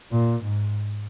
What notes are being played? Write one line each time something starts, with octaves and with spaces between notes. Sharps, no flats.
A#2
G#2